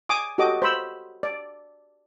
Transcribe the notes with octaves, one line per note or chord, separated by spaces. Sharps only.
G#5 D6 D#6
F#4 G4 A4 D#5 D6
C5 B5 E6
D5